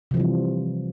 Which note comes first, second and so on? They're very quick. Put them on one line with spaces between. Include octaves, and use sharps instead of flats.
C3 F3 E3 G3